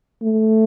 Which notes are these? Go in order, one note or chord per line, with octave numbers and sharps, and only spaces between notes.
A3